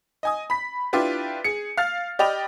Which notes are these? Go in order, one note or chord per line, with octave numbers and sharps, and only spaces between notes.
D#5 G#5 D#6
B5 B6
D4 E4 F4 G4 B4
G#4 C#7
F5 F6 A6
G4 D5 D#5 G5 B5 F7